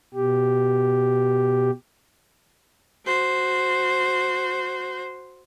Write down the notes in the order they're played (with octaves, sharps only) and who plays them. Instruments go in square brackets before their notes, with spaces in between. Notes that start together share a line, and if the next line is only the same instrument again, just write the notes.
[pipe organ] B2 G4
[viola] F#4 C5